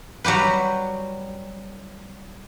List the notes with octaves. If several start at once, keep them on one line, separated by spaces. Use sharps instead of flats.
F#3 G3 G4 B4